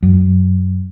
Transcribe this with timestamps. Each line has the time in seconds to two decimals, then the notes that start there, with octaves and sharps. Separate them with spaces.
0.03 F#2